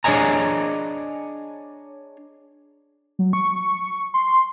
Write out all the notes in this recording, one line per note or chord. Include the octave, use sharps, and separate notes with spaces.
D4 G#4 C#5 D#5 G#5 A#5
F#3
C#6
C6